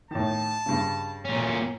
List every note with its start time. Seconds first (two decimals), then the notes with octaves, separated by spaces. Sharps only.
0.11 A2 D#3 A5
0.66 G2 C#3
1.25 A#2 C#4